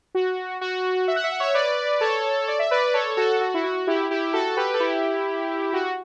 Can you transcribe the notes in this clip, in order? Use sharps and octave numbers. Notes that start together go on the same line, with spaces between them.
F#4
F#4
E5
F#5
E5
F#5
C#5 E5
B4 D5
A4 C#5
D5
E5
B4 D5
A4 C#5
F#4 A4
F#4
E4
F#4
E4 G4
E4 G4
F#4 A4
G4 B4
A4
E4 G4
F#4